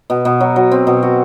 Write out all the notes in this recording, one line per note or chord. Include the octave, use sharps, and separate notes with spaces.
B2
B2
F#3
F#3
C4
B2
F#4